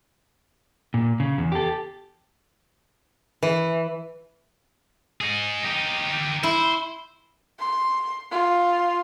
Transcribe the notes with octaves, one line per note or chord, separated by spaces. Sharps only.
A#2
C#3
E2
G4 A4
E3
D#4 G#4
D#4 G4
E4 C5
C6
F4